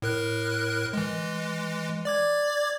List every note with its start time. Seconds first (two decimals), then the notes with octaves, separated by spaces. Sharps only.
0.02 A2 A#4 F#6
0.93 E3 G#3
2.05 D5 D6 G#6